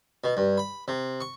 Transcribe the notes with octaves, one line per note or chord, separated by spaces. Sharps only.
B2
G2
B5
C3
C#6